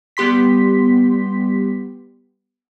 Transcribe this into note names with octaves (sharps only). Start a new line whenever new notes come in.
G3 B3 G4 C6 B6